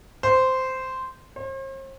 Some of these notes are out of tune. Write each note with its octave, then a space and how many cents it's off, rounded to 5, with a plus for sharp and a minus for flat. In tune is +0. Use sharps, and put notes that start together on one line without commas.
C5 -10
C5 +45